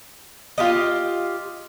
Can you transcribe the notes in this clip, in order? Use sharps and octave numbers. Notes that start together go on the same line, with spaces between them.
F4 G4 D#5